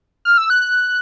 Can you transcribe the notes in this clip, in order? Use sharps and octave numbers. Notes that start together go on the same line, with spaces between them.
F6
E6
F#6